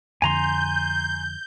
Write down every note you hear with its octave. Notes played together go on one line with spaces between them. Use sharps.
F2 D3 F3 G#5 A#5 C6 G6